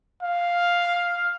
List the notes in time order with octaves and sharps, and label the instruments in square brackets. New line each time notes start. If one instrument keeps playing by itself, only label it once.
[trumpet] F5